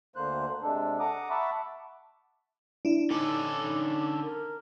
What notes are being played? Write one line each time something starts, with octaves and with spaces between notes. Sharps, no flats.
D2 D3 A#3 C5 F#6
C3 G#3 D4 A4
F#5 A#5 D6 D#6
E5 F#5 A5 B5 C#6 D6
D4 E4
D3 C#4 D#4 A4 D6
A#4